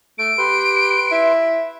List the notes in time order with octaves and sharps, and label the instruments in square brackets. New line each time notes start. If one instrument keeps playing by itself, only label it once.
[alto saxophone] A3 [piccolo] D7
[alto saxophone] G4 [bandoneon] B4 C6
[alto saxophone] E4